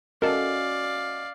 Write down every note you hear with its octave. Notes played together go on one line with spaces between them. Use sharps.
C#4 F#4 A4 A#4 D5 D#5 F5